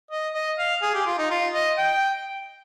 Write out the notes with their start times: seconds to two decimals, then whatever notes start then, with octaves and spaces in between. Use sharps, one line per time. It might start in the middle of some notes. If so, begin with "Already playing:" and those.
0.11 D#5
0.35 D#5
0.59 F5
0.82 G#4
0.94 G4
1.06 F4
1.18 D#4
1.30 F4
1.54 D#5
1.78 G5